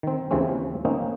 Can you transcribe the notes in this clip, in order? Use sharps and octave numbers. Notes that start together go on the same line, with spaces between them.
D#3 C4
D#2 C#3 E3 F3 C4 C#4
A#3 C4 C#4 D#4